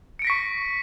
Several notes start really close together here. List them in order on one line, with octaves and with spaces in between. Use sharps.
C#7 D7 A#6 B6 C#6